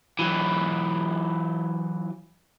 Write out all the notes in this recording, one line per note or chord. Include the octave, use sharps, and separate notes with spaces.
E3 F#3